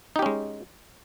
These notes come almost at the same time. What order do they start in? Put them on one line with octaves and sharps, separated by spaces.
D#4 G4 C#4 G#3